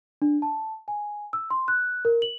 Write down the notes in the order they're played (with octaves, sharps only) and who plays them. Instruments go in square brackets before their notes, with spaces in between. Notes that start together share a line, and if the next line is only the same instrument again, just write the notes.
[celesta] D4
A5
G#5
E6
C6
F#6
A#4
F#7